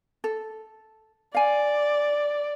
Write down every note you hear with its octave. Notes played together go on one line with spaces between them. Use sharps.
A4
D5 F5 G#5